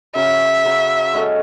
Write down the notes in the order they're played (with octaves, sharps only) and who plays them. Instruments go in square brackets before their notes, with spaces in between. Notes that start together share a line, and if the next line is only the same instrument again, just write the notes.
[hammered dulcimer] C#3 F#3 C#4 [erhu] E5
[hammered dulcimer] C#3 F#3 C#4
G#3 C#4 F#4 A4